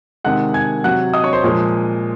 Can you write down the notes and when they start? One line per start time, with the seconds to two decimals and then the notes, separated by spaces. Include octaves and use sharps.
0.24 C3 D#3 G#3 F#5 F#6
0.54 G#5 G#6
0.84 C3 F#3 F#5 F#6
1.14 D#5 D#6
1.24 C#5 C#6
1.33 C5 C6
1.44 A#2 F3 G#3